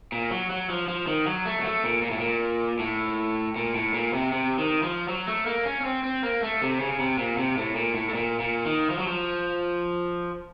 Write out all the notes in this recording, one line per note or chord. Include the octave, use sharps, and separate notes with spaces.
A#2
F#3
F#3
F3
F3
D#3
F#3
A3
F#3
A3
A#2
A#2
A2
A#2
A2
A#2
A2
A#2
C3
C3
D#3
F3
F#3
A3
A#3
C#4
C#4
C4
C4
A#3
A3
C3
C#3
C3
A#2
C3
A2
A#2
A2
A2
A#2
A#2
D#3
F3
F#3
F3